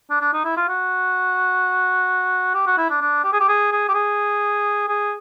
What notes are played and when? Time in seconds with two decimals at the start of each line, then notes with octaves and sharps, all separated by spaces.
0.10 D4
0.21 D4
0.33 D#4
0.44 E4
0.57 F4
0.68 F#4
2.54 G4
2.67 F#4
2.78 E4
2.90 D4
3.01 D4
3.24 G4
3.33 G#4
3.40 G4
3.48 G#4
3.72 G#4
3.88 G4
3.94 G#4
4.88 G#4